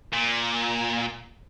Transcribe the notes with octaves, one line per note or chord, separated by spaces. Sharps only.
A#2